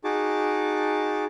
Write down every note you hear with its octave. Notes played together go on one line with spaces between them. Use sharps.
D#4 F#4 G#4 A5 D6